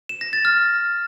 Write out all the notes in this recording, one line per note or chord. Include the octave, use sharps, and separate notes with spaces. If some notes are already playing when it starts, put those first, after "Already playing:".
E7
A#6
A6
F6